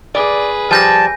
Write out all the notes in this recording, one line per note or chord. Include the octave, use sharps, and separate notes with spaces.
G#4 B4 D5
F3 G3 G#5 A5 G6 A#6